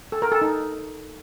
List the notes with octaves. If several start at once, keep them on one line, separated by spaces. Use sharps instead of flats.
A4
A#4
A4
D#4